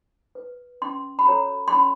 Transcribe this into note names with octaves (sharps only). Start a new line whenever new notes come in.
B4
C#4 C6
B5
F#4 A4 C#5 A#5
C6
C#4 B5